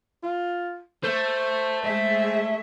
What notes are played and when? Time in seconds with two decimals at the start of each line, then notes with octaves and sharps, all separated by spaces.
0.23 F4
1.03 A3 C5
1.82 G#3 G#4 C5 E5